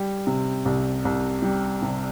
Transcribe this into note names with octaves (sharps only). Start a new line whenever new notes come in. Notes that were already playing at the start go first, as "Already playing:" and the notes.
Already playing: G3
C3
C2
C2
G3
C3